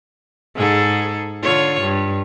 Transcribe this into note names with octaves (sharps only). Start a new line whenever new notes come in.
G#2 G#4 A4
D3 F4 C#5
G2